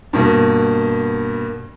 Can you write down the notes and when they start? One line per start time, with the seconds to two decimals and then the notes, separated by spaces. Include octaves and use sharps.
0.13 G2 B2 A#3